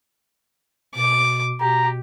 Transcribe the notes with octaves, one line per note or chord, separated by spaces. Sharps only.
B2 D6
B2 G4 A#5